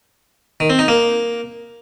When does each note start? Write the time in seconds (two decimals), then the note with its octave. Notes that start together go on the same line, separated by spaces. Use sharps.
0.60 D#3
0.70 C4
0.79 D#4
0.88 A#3